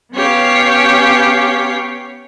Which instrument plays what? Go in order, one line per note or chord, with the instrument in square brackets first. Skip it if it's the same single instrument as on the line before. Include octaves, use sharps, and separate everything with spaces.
[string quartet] B3 C#4 G4 C#5 F5